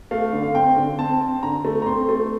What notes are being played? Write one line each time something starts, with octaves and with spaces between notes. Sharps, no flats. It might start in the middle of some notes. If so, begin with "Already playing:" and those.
A3 F5
D3
F5
C4 G5
D3
C4 A5
C4
D3 A#5
A3
A#5
C4 C6
A3